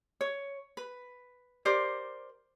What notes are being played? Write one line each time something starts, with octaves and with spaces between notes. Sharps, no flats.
C#5
B4
G4 A#4 C5 D5